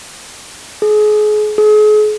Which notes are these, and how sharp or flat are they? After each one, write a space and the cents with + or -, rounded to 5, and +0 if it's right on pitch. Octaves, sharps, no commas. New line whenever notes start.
G#4 +35
G#4 +40